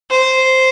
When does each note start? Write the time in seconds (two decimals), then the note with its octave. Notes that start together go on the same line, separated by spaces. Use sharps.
0.10 C5